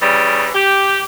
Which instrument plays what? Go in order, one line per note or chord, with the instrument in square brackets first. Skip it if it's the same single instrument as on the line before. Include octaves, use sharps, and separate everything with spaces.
[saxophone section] C#3 E3 G3
G4